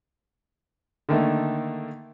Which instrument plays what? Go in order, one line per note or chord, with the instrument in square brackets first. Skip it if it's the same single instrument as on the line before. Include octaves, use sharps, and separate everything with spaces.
[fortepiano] D3 D#3 A3 A#3